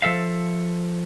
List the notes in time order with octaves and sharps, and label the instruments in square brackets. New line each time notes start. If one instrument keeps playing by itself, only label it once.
[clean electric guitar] F3 A4 E5 F5